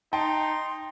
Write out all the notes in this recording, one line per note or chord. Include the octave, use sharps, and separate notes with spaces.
D#4 G5 A5 C6